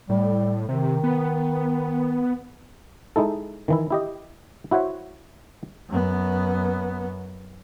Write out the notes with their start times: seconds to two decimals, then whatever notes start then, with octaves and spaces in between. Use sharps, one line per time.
0.09 A2 G3
0.69 C3 D#3
1.04 B3
3.16 G#3 D#4 E4 A4
3.68 D#3 E3 E4
3.91 E4 G4 D#5
4.71 E4 F#4 C5 C#5 E5
5.89 F#2 B3